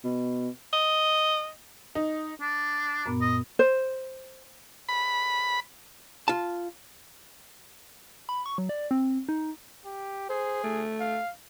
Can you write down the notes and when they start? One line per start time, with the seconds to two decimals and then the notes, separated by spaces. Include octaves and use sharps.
0.04 B2
0.73 D#5
1.95 D#4
2.41 D4
3.06 F#2 A#2 B3
3.21 D#5
3.59 C5
4.89 B5
6.28 F4 A5
8.29 B5
8.46 C#6
8.58 F#3
8.69 D5
8.91 C4
9.29 D#4
9.86 G4
10.30 G#4 C5
10.64 A3
11.01 F5